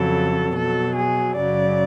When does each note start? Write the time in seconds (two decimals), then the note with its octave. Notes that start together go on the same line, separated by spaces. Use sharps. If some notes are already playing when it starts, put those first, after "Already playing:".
Already playing: F2 C#3 F#3 A4
0.54 B2 F#3 A4
0.95 G#4
1.36 F#2 C#3 F#3 D5